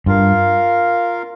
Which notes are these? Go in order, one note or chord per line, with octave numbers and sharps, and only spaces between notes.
G2 F4 A#4 F5